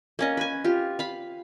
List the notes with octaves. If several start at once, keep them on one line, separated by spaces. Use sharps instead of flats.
A#3 C#4 D#5
B4 G#5
F4 G4
F5 B5